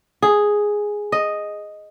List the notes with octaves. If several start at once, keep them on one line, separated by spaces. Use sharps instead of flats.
G#4
D#5